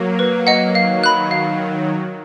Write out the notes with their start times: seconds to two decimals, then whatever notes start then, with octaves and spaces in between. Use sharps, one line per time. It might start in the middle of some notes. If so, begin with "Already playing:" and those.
Already playing: F#3 A#3
0.19 B4
0.47 D#5 F#5
0.74 D#3 F#3 F5
1.04 B5 F#6
1.31 F5